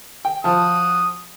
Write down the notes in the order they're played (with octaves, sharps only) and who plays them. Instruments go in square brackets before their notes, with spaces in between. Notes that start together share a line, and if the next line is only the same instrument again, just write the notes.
[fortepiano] G5
[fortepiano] F3 A5 [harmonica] F#4 D#6